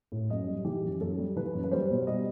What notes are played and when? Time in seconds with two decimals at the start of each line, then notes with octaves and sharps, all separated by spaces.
0.12 A2
0.30 F#2 D#5
0.47 G3
0.65 E3 G4
0.83 F#2
1.01 F#2 A4
1.18 G3
1.36 E3 B4
1.54 F#2
1.64 B4
1.71 G3 C5
1.90 B2
2.07 G3 D#5